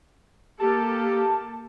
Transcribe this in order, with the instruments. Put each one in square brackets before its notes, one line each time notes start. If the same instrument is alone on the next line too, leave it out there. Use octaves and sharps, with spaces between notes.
[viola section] A#3 G4 A4 [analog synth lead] A5